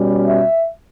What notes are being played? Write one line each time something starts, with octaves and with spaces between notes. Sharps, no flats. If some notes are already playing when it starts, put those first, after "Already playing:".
Already playing: B2 G3 C#4
E5